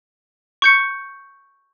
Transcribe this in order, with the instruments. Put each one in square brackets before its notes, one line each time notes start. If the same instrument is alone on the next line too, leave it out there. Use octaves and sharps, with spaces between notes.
[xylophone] C#6 G6 C#7